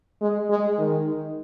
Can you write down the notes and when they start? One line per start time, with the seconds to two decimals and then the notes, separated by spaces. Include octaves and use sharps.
0.21 G#3
0.50 G#3
0.79 D#3